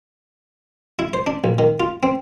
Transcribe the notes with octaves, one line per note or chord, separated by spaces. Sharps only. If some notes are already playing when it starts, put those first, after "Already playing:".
E4
C5
D4
A#1
D#3
F4
C4